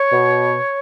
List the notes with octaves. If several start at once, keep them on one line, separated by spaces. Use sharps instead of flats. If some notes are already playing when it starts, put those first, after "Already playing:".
Already playing: C#5
B2